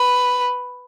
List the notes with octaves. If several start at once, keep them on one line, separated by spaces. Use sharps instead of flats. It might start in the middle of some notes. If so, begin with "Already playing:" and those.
Already playing: B4